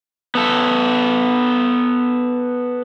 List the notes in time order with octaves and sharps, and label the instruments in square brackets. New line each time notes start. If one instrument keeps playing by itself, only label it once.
[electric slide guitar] B3 A4